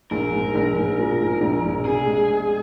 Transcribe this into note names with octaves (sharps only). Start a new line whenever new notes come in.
A#1 A#4
G#2
A#1
G#2
F3
G#2
A#1
A#1
C3 G#4
G#3
G#3